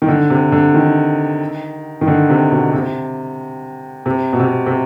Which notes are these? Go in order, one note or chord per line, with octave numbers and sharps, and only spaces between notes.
D#3
D3
C3
D3
D#3
D#3
D3
C3
B2
C3
C3
B2
C3
C3